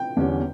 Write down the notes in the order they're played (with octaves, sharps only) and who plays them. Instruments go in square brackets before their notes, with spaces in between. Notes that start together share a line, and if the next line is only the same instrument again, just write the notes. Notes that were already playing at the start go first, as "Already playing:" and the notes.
Already playing: [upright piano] G5
[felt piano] E2 D3 G3 C#4